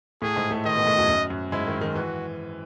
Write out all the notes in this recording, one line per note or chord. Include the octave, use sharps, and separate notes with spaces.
A2 A3 G#4
G#2 G#3
A2 A3
D#3 D#4 D#5
B2 B3
A2 A3
F#2 F#3
F#2 F#3
F#2 F#3
G#2 G#3 E4
D#3
D#3
E3 F#4